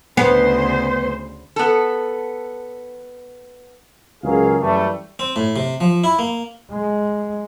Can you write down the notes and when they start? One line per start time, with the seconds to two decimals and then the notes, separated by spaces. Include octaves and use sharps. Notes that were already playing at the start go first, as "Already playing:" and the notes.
0.17 D2 C#3 B3 C5
1.56 B3 A4
4.24 C#2 C#3 F#3 G#4 A#4 F5
4.60 F#2 E3 G3 A3
5.19 C4
5.36 A2
5.56 C3
5.80 F3
6.04 E4
6.19 A#3
6.71 G#3